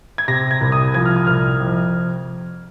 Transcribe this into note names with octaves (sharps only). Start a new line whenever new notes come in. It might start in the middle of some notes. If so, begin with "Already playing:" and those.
G#6
C3 A#6
G#6
C2
D#6
F3 G#6
F6
D#6
C2 F6
F2